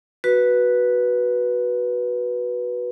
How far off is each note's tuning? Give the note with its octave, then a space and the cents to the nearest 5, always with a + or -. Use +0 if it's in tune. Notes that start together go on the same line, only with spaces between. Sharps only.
F#4 +0 B4 -10